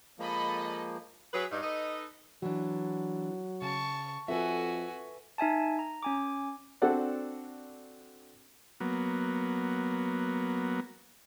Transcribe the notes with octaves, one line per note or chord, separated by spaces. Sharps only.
F3 G#3 A#3 A4 D#5 B5
F#3 G#4 B4
G2 D#4
A4 B4 D#5
E3 F#3 D4
C#3 A5 C#6
F2 F#4 A4 B4 E5 G#5
D#4 E5 G#5 A5
A#5
C#4 G#5 D6
C4 D4 F#4 A4 D5 F#5
F#3 A#3 B3